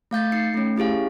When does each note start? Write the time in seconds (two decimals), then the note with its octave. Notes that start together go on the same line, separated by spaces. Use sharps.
0.11 A3 F5 G6 A6
0.32 D#4 C7 C#7
0.54 A3 C#4
0.76 C#4 E4 G4 G#4 F5